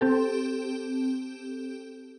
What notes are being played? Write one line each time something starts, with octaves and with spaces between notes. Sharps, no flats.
C4 G4 A4